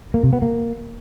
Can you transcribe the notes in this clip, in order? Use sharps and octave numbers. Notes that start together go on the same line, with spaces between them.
A#3
C3
B3
A#3